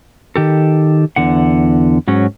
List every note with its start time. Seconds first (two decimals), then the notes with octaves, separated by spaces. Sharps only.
0.36 D#3 G4 A4
1.16 E2 D3 F#5
2.08 G#2 F#3 C#4